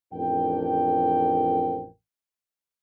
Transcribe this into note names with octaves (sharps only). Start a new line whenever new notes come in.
A1 F2 F3 D4 A#4 G5